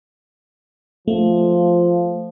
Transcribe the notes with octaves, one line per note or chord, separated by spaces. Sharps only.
F3 A3